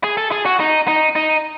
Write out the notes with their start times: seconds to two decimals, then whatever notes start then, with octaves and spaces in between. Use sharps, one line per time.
0.04 G#4
0.17 A4
0.32 G#4
0.46 F#4
0.60 D#4
0.88 D#4
1.16 D#4